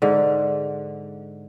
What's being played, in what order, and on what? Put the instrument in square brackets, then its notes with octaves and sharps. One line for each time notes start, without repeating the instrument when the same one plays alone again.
[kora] G#2 D3